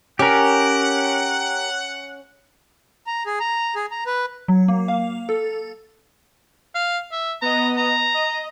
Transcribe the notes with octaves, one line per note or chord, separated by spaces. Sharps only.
C#4 G4 A#4 F#5
A#5
G#4
A#5
G#4
A#5
B4
F#3
A#3
F5
A4
F5
E5
B3 D#5 A#5
A#5
D#5